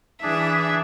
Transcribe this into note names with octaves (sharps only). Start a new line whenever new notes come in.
E3 D4 G#4 E5